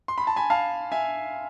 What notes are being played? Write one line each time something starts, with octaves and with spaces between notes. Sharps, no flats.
C6
B5
A5
G#5 B5
F5 A5
E5 G#5